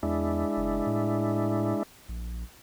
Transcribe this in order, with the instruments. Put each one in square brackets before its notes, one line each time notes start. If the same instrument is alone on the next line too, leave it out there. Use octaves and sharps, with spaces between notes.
[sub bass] E2 [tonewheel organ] G#3 D4 E4
[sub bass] F#1
A2
A#1